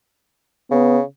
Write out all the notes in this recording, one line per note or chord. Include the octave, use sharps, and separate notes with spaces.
C#3 B3